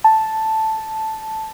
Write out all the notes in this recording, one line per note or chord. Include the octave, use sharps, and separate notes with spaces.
A5